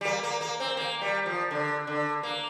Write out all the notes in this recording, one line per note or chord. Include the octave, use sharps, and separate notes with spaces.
G3
A#3
A#3
A#3
C4
A#3
G3
F3
D3
D3
A#3